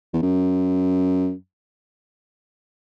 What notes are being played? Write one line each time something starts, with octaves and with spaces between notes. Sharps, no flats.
E2
F#2